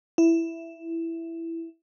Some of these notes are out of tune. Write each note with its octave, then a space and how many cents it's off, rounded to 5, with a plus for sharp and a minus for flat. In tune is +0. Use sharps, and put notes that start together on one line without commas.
E4 +5